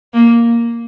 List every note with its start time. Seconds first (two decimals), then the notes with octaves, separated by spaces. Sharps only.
0.14 A#3